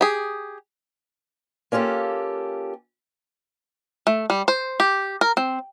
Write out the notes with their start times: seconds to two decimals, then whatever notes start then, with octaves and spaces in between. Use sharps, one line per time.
0.01 G4 G#4
1.72 A#3 C#4 F4 G4 A4
4.07 A3
4.30 G3
4.48 C5
4.80 G4
5.21 A#4
5.37 C4